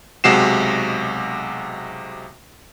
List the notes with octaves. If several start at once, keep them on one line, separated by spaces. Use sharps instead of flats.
B1 C3 G#3 F#4 C7 E7